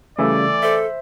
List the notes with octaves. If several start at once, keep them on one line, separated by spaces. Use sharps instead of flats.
C#3 E3 G3 A3 D5
A4 C5 E5